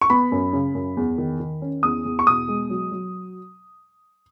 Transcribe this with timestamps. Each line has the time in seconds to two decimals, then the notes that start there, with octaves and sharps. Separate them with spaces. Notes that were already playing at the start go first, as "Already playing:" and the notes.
0.01 C#6
0.10 B3 B5
0.32 F#2
0.53 C#3
0.75 F#2
0.97 E2
1.18 D#3
1.40 D#3
1.62 C#4
1.83 E2 D#6
2.05 E2
2.19 C#6
2.27 B2 D#6
2.48 G#3
2.70 F#3
2.92 F#3